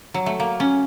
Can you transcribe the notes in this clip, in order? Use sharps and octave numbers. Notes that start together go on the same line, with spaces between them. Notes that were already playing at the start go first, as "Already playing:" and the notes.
F#3
A3
A#3
C#4